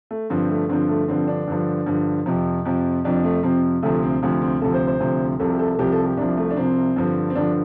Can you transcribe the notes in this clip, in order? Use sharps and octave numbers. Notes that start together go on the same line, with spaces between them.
A3
G2 D3 F3 C4
A3
G2 D3 F3 C4
A3
G2 D3 F3 C4
D4
G2 D3 F3
G2 D3 F3
F2 C3 F3
F2 C3 F3
F2 C3 F3 D4
A3
F2 C3 F3 C4
D2 C3 F3 A3
C4
D2 C3 F3
C4
D2 C3 F3 A4
C5
C5
D2 C3 F3
C2 C3 F3 A4
G4
A4
A4
C2 C3 F3 G4
A4
G4
C2 C3 F3 D4
A3
D4
C2 C3 F3 C4
G2 D3 F3
C4
G2 D3 F3 D4